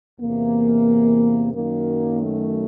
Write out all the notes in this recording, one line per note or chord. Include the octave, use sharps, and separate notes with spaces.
E2 C3 E3 A#3
F#2 D#3 F#3 A#3
A3